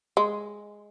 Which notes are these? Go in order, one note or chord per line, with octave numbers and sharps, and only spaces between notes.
G#3